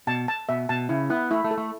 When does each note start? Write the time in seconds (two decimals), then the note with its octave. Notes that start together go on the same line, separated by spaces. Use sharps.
0.07 B2 A5
0.28 A5
0.49 B2 E5
0.69 B2 A5
0.89 C#3 E4
1.10 B3 E4
1.31 A3 E4
1.44 A3
1.51 A4
1.58 A3